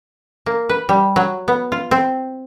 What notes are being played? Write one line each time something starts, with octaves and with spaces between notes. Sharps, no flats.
A#3
B4
G3
F#3
B3
F4
C4